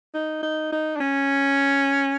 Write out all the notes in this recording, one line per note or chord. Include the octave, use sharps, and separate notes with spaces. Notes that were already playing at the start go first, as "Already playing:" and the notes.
D#4
D#4
D#4
D4
C#4